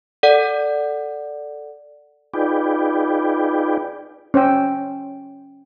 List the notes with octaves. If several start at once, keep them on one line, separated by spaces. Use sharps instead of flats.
A4 D5 F#5
D#4 F4 G#4 B4 D5 G5
C#4 C5 C#5 G5 E6